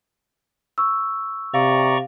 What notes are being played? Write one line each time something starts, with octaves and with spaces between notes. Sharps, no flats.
C#6 E6
C3 D5 F5 A#5 C#6